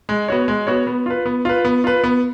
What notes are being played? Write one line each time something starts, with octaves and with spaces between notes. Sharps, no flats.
G#3
B3 F#4 C#5
G#3
B3 F#4 C#5
B3
F4 B4
B3
F4 B4
B3
F4 B4
B3